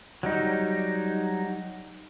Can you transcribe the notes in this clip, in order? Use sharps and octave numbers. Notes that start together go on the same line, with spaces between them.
F#3 G3 D#4